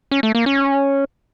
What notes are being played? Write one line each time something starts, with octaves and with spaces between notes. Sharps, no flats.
C#4
A3
A#3
C#4